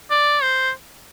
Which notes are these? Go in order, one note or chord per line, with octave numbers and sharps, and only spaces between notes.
D5
C5